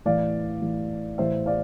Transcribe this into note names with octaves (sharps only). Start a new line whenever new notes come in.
A2 E3 D5 F5
A2 E3
A2 E3 C5 E5
D5 F5